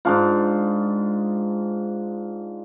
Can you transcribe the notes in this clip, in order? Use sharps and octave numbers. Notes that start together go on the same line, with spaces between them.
G#2 D4 F4